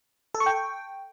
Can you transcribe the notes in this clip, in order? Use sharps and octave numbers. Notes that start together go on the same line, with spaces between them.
A4
C#6
G5